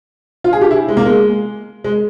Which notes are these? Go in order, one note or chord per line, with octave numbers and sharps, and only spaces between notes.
F4
G#4
G4
E4
G#3
A#3
G#3
G#3